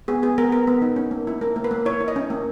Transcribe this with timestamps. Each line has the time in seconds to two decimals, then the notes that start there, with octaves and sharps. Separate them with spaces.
0.08 B3 G#4
0.22 B3 G#4
0.38 B3 A#4
0.52 B3 A#4
0.67 B3
0.82 D#4
0.96 C#4
1.11 A#3
1.27 E4
1.41 A#3 A#4
1.56 A#3
1.64 B4
1.71 A#3
1.86 E4 C#5
2.01 E4
2.08 D#5
2.16 C#4
2.30 A#3